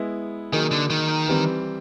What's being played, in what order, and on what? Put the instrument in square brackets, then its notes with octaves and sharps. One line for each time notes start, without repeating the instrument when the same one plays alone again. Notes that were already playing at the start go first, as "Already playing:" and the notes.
Already playing: [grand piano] G#3 B3 E4
[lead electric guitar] D#3 [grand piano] F#3 A#3 D#4 G#4
[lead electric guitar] D3
D#3
[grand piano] E3 G3 C4